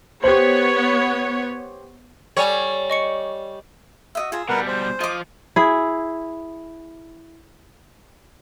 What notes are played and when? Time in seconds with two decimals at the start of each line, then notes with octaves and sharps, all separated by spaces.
0.24 B3 G4 C5 C#5
2.37 G3 A4 C#5 D5 G#5
2.90 D#5 C#6 C#7
4.15 F#4 D#5 E5
4.32 F4 G#4 E5 A#5
4.49 B2 G3 A#4 B4 F#5
4.67 C5
5.01 F3 F4 D#5 D6
5.56 E4 G#4